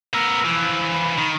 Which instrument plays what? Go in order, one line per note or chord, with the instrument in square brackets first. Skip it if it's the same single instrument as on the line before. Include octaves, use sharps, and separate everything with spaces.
[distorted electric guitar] B3 A#4 [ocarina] E6
[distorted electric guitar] E3 F3
[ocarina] B5
[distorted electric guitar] D#3